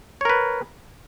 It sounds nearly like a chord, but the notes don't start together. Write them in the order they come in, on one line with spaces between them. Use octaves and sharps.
C#5 A#4 B4